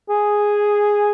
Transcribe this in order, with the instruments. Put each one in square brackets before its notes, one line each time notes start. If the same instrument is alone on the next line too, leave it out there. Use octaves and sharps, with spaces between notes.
[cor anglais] G#4